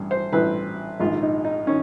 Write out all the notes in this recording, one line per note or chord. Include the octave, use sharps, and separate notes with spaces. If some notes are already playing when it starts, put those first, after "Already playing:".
Already playing: A1 G2
C5
A1 G2 E3 B4
A#1 G#2 D#3 F4
D#4
D#4
D#3 C#4